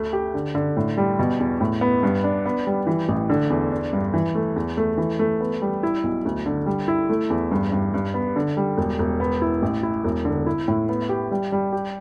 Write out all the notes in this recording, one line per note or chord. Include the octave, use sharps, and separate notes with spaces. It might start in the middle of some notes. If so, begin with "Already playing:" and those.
Already playing: D2 A3
G4
D3
D3
A2
G3
B2
E2
A2
B3
G2
D4
B3
G3
E3
A1
D3
E2
D4
G2
E3
A3
E2
A3
E3
A3
B3
G3
E4
B1
D2
D3
G3
E4
A3
E2
G2
G2
G2
B3
D3
G3
E1
E1
B3
E4
A1
E4
E1
D3
E4
A2
B3
G4
G3
G3
G4